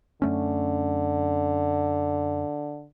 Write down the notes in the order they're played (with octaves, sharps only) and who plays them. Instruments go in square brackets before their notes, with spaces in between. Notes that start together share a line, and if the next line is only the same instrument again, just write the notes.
[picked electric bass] F#2 A3 C#4 [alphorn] D3